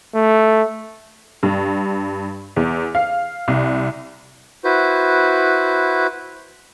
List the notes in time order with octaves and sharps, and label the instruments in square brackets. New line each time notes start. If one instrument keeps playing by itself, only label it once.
[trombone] A3
[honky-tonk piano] G2
E2
F5
C2
[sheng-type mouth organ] E4 F#4 B4 C5